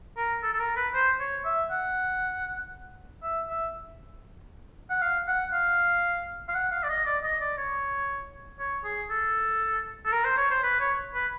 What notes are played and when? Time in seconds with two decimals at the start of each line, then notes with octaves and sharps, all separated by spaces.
0.17 A#4
0.43 A4
0.53 A4
0.60 A#4
0.76 B4
0.94 C5
1.20 C#5
1.45 E5
1.70 F#5
3.23 E5
3.49 E5
4.90 F#5
5.02 F5
5.27 F#5
5.53 F5
6.48 F5
6.55 F#5
6.72 F5
6.83 D5
6.89 D#5
7.06 D5
7.23 D#5
7.40 D5
7.57 C#5
8.59 C#5
8.85 G#4
9.10 A4
10.05 A4
10.12 A#4
10.25 C5
10.38 C#5
10.51 C5
10.63 B4
10.80 C#5
11.14 B4